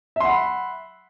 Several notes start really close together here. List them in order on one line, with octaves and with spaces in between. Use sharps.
E5 C6 F#5 B5